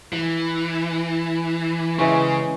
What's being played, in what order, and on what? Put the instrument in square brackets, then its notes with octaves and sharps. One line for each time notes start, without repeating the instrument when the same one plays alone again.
[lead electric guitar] E3
[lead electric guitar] C#3 [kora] E3 G#3 C#4